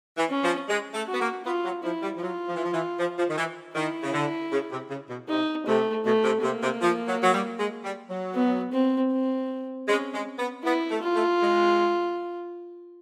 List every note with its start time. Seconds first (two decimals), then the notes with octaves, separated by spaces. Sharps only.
0.17 E3
0.30 C#4
0.43 F3
0.68 G#3
0.94 A3
1.07 F#4
1.13 B3
1.20 A#3
1.45 B3 F4
1.64 F#3
1.83 F3 E4
2.03 G3
2.17 F3
2.21 F#3 F4
2.47 F3
2.56 E3
2.64 F3
2.73 E3
2.99 F3
3.17 F3
3.28 D#3
3.37 E3
3.75 D#3 E4
4.03 C#3
4.13 D3
4.52 C#3
4.70 C3
4.90 C#3
5.09 B2
5.28 C3 D#4
5.67 C3 A3
6.05 B2 A3
6.24 C3
6.43 C3 A#3
6.62 C3
6.81 F3
7.07 F#3
7.22 F#3
7.33 G3
7.58 G#3
7.84 G3
8.09 F#3
8.34 B3
8.72 C4
9.12 C4
9.88 G#3 C#4
10.13 G#3
10.38 B3
10.64 B3 E4
10.90 A3
11.02 F4
11.15 A3
11.41 G#3